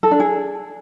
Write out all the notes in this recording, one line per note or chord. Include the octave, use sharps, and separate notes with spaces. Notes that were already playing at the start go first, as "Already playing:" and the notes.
A4
D4
G#4